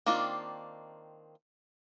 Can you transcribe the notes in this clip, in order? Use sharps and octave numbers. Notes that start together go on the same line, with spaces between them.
D#3 A#3 C4 D4 F4